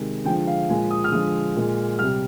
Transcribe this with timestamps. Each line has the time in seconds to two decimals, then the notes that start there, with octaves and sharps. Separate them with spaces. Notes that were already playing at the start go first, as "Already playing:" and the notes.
Already playing: C3 D#3 G#3
0.25 D3 F3 G#3 G5
0.47 F5
0.69 A#2 F3 G#3 G#5
0.91 D#6
1.04 F6
1.12 D3 F3 G#3 D#6
1.56 A#2 G#3
1.99 C3 G3 F6